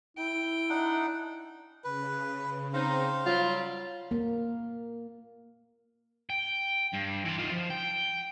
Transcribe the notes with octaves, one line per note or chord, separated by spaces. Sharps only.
E4 G5
D4 D#4 F#5
C#3 B4
C4 D#4 C5 F5
F#3 G3 F4
A#3
G5
G2
E3 C6
D#3 F4
F3
G5